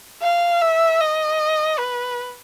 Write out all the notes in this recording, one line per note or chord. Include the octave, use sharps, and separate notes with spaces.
F5
E5
D#5
B4